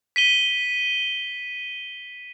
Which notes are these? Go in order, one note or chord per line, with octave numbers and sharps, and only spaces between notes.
B6 D#7 G7